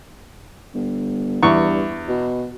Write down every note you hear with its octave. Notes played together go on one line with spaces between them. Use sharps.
G1
E2 G2 C#6
B2